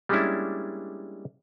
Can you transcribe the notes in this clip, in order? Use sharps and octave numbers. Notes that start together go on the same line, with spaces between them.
G3 G#3 A#3 C#4 D4 E4